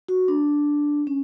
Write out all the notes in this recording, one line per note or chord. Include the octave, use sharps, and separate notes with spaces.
F#4
D4
C#4